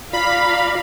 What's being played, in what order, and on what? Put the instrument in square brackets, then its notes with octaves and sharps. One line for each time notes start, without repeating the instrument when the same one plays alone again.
[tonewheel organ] F4 D5 A#5 [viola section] F5 [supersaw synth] B5